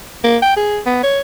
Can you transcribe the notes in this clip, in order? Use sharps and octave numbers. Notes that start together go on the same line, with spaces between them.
A#3
G5
G#4
B3
C#5